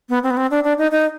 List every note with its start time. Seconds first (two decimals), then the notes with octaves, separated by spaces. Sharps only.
0.09 B3
0.23 C4
0.30 B3
0.37 C4
0.51 D4
0.64 D4
0.78 D#4
0.91 D#4